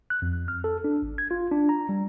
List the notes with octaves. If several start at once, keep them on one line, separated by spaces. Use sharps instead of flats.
F#6
F2
F6
A4
D4
G#1
G#6
F4
D4
A#5
G3